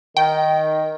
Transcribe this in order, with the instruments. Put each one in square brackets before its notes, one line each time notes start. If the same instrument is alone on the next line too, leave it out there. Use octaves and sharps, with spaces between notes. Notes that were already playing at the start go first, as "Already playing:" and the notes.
[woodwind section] D#3 [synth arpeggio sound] G5